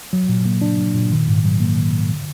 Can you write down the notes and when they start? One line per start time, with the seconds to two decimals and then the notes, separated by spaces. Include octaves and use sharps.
0.13 F#3
0.29 A#2
0.45 A#3
0.61 D4
0.78 F#3
0.94 A#2
1.12 D#3
1.28 G#2
1.45 F#3
1.60 A#3
1.77 D#3
1.94 G#2
2.11 D3